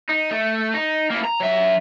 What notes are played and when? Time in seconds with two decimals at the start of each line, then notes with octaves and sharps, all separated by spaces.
0.09 D#4
0.31 A3
0.74 D#4
1.10 A#3 E4
1.25 A#5
1.41 F#3 E5